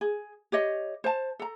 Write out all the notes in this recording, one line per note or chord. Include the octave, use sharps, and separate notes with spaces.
G#4
G4 C#5 D#5
C5 A5
A4 A#5